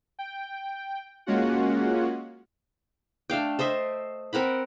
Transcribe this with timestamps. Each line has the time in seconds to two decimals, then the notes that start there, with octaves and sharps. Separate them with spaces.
0.19 G5
1.26 G#3 A#3 C#4 F4 F#4 F#5
3.30 A3 D4 F5 G5
3.59 A4 C5 D#5 E5
4.33 C4 A#4 F#5 B5